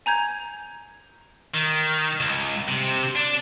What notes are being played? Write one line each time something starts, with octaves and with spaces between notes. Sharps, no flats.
G#5 A#5 G6 G#6
D#3
C#2
C3
D4